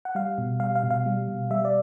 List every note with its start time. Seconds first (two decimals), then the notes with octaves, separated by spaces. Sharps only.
0.05 F#5
0.15 G3 F5
0.38 B2
0.60 G3 F5
0.76 F5
0.83 B2
0.91 F5
1.06 G3
1.29 B2
1.50 G3 E5
1.65 D5